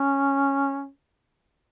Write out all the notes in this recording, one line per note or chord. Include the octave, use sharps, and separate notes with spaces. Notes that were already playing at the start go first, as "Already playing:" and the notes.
Already playing: C#4